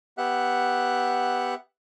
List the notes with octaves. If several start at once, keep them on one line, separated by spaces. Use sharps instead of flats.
B3 G4 E5 F#5 F#6